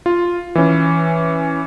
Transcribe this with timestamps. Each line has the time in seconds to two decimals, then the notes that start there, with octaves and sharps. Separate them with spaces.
0.06 F4
0.55 E3 C#4